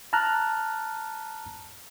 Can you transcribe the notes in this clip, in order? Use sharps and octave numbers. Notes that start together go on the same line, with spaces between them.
A5 A#5 F6 F#6